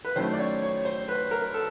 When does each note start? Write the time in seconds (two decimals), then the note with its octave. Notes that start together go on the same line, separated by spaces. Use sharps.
0.05 B4
0.16 D#3 F#3 A3 C#4 E4 C5
0.33 D5
0.39 C#5
0.62 C#5
0.85 C5
1.08 B4
1.31 A#4
1.54 A4